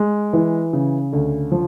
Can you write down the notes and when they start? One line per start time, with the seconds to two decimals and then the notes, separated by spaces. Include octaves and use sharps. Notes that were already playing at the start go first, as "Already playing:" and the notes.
Already playing: G#3
0.33 E3
0.73 C#3
1.13 D2
1.52 F3